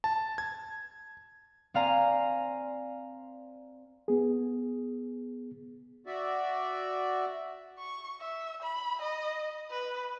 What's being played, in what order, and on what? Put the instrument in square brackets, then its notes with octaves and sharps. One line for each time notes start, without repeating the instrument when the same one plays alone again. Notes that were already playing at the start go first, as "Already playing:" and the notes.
[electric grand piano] A5
G#6
[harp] C4 D5 F5 G#5 A#5
[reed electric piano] B3 G#4
[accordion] F#4 D5 E5
[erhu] C#6
E5
B5
D#5
B4